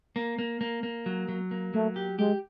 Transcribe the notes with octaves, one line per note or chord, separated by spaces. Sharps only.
A#3
A#3
A#3
A#3
F#3
F#3
A#3
F#3 A3
G4
G#3 G4